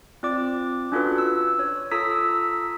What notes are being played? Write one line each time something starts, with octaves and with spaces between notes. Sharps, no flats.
C4 F4 D5 D6
C#4 D4 F4 F#4 A4 B4
E6
C#5
F4 A4 A#5 D#6 E6 B6